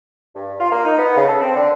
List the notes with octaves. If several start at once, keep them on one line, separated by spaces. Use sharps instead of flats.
G2
F4
A#3
D#4
B3
C#3
A4
C4
D3